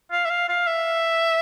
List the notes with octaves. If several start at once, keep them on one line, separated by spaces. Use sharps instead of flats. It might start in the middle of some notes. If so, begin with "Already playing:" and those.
F5
E5
F5
F5
E5